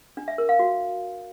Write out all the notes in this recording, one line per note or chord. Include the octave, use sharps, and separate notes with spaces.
D4
E5
A#4
F5
F#4